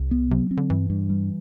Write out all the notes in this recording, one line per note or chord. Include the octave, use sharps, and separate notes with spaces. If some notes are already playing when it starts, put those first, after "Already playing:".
Already playing: C2 C3
B3
C3 F#3
C4
D3
G2 E3
G2
G3